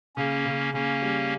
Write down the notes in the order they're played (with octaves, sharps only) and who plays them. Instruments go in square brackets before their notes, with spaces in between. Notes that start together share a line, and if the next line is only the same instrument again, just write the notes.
[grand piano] C#3 [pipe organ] A#3 C#4
[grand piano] C#3
[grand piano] C#3 [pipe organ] A#3 C#4
[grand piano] G3